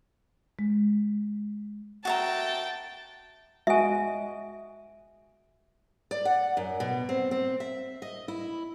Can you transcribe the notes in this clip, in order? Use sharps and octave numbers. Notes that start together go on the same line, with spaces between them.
G#3
F#4 E5 G5 A5 A#5
G#3 F#4 D#5 E5 G#5
D5
F#5
F#2
B2
C4
C4
E5
D#5
E4